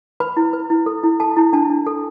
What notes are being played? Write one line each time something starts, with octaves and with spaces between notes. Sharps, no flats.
B4 B5
E4
B4
E4
A4
E4
A4 A5
E4
D4 A5
D4
A4